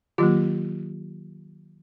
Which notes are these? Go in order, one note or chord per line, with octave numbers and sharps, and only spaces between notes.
D#3 F#3 A#3 F4 G4